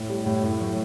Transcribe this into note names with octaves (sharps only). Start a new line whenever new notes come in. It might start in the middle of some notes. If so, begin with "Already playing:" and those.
Already playing: A2
G3
A2
A2
F#3